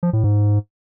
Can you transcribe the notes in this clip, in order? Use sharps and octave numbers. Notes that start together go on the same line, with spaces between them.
F3
A2
G#2